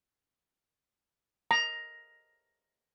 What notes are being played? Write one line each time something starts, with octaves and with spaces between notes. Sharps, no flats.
A#5